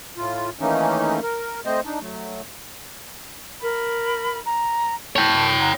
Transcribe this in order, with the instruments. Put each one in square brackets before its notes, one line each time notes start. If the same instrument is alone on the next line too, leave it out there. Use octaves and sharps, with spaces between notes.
[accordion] A2 F4
D#3 E3 A3 A#3 C#4 D#4
A#4
A3 C4 C5 D#5
D4 D#4
F#3 A3
[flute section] A#4 B5
A#5
[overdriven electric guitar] C#5 G5 [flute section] A5
[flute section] F#5 A#5